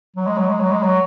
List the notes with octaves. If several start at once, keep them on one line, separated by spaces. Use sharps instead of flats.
F#3
G#3
F#3
G#3
F#3
G#3
F#3